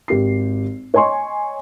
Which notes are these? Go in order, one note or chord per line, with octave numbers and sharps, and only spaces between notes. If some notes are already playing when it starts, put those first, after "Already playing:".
G#1 G4 C7
C#5 D#5 G#5 C6 C#6